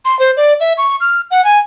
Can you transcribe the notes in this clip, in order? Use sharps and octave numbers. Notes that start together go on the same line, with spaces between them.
C6
C5
D5
E5
C#6
F6
F#5
G#5